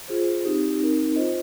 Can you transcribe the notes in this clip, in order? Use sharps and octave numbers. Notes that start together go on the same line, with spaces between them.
F4 G#4 C5
C4 D#4 G4
C4 D#4 A#4
F4 C5 D#5